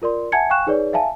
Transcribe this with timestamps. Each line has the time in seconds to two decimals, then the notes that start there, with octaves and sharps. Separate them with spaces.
0.02 F4 A#4 D5 C6
0.32 E5 F#5 G#5 A5 G#6 C#7
0.50 F5 G5 G#5 C#6 F#6 E7
0.67 D#4 G#4 B4 C#5 D5
0.93 E5 F5 G#5 A5